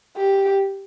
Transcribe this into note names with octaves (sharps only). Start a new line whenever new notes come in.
G4